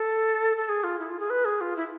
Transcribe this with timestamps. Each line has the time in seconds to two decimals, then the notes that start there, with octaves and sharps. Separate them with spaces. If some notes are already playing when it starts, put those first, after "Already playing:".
Already playing: A4
0.57 A4
0.69 G#4
0.84 F4
0.99 E4
1.10 F4
1.20 G#4
1.30 B4
1.45 G#4
1.61 F4
1.76 E4